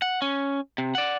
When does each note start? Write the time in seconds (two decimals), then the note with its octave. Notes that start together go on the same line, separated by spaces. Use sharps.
0.02 F#5
0.22 C#4
0.78 C3
0.95 D5 F#5